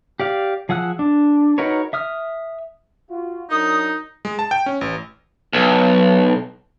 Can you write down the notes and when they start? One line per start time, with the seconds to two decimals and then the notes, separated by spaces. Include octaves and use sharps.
0.20 G4 D5 F5
0.69 F3 G#4 F#5 E6 F#6
0.99 D4
1.58 D#4 F#4 A#4 B4 C#5
1.93 E5 D#6 F6
3.09 F4 F#4
3.50 F#3 D4 D#4 A#4 D#6
4.25 G#3
4.39 A5
4.51 G5
4.66 C#4
4.81 A1
5.53 B1